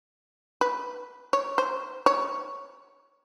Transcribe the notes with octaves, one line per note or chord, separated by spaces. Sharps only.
B4
C#5
C5
C#5